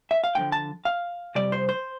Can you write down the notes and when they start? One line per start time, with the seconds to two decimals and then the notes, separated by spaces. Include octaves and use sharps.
0.11 E5
0.24 F5
0.35 D2 D3 F3 G5
0.52 A5
0.85 F5
1.35 F2 C3 G3 D5
1.52 C5
1.69 C5